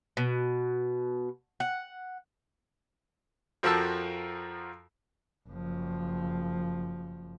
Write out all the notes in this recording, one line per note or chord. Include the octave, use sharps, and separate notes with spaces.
B2
F#5
F2 F3 F#4 A#4 A5 E6
F#1 F3